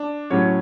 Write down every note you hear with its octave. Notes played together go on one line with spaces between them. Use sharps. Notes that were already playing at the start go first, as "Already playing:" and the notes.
Already playing: D4
A2 F#3 C#4 C#5